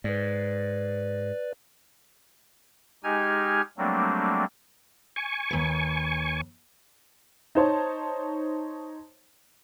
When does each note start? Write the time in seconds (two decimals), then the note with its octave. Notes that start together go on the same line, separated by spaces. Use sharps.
0.04 G#2 B4 D5
3.04 G#3 D#4 G4 G#5 F6 G#6
3.78 F#3 G3 A3 A#3 C4 D4
5.16 G#5 C#6
5.51 D#2 B4
7.55 D#4 C5 C#5 A5